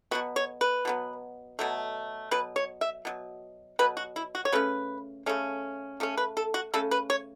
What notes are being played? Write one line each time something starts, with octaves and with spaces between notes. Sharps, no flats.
B2 F#3 B3 F#4
C#5
B4
B2 F#3 B3
B2 F#3 A3
B2 F#3 B4
C#5
E5
B2 F#3
B2 F#3 B4
F#4
E4
F#4
C#5
C#3 A3 C#4 B4
C#3 A3 C#4
C#3 A3 C#4
B4
A4
F#4
C#3 A3 C#4 A4
B4
C#5